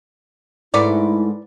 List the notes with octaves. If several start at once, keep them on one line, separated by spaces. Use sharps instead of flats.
G#2 A3 E4 B4 C#5 D5